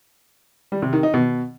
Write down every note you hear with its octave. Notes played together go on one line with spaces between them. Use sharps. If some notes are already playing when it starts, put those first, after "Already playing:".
G3
C3
D#3
D#4
B2